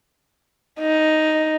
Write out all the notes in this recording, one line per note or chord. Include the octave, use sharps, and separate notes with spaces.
D#4